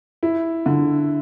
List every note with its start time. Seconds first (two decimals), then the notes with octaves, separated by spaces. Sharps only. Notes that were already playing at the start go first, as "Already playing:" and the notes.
0.23 E4
0.66 D3